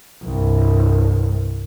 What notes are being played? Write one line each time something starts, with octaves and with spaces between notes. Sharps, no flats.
C2 G2